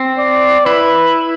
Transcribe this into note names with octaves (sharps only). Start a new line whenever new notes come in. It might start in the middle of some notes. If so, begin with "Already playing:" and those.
Already playing: C4
D5
E4 B4